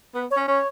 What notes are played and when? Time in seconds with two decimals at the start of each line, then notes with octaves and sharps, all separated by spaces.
0.14 B3 B4
0.31 C#5
0.36 C#4
0.48 C#4 C#5